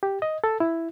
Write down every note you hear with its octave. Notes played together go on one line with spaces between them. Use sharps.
G4
D#5
A4
E4